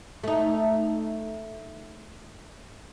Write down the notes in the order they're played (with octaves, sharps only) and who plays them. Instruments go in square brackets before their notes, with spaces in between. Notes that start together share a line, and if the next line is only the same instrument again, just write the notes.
[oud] A3 D#4